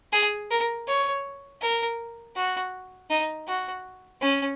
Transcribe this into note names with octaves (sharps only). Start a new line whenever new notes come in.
G#4
A#4
C#5
A#4
F#4
D#4
F#4
C#4